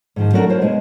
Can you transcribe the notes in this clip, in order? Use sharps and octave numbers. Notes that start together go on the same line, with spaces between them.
G#2 D#3 F3
F#3 A3 C#4 D4 F#4 A#4
E4 F4 C5 C#5
B2 G#3